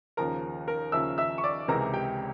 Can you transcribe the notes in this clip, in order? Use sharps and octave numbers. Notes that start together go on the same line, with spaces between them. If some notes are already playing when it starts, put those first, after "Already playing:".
D#2 C#3 F3 A#4 A#5
A#4 A#5
D#2 C#3 F3 E5 E6
E5 E6
C#6
D5 D6
C#2 C3 E3 G#3 A#4 A#5
G4 G5